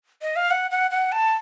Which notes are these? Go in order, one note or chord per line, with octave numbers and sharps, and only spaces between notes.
D#5
F5
F#5
F#5
F#5
A5